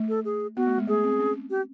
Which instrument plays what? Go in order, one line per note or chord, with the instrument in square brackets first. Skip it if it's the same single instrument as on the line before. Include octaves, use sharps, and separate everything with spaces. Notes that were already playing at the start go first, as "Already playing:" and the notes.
Already playing: [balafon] A3
[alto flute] A4
G#4
[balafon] B3 [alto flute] F#4
[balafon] A3
G#3
[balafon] A3 [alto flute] G#4
[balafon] C4
C#4
[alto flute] G4